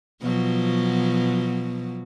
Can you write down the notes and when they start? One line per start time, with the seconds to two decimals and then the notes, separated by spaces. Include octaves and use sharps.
0.21 B2 F3 F#3